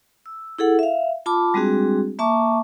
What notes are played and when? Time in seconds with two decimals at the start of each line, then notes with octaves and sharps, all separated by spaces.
0.26 E6
0.58 E4 G#4 A4 F#5
0.79 E5 F5
1.26 F4 A5 B5 D6
1.54 G3 G#3 C4 D4 F#4 G#4
2.19 A#3 E5 A5 C#6 D6